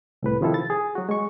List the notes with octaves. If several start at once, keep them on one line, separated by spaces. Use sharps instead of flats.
C2 A2 B4
C3 D#3 F3 C4 E4 A4
A6
G#4
F#3 F#4
G#3 C#6